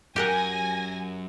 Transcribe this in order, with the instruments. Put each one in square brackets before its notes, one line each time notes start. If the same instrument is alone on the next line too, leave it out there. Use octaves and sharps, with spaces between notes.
[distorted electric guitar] F#2 [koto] G4 A#4 F#5 [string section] G#5 A#6